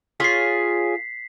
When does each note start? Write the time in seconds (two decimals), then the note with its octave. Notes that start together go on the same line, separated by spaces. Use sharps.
0.20 F4 G#4 C#5 B6 C7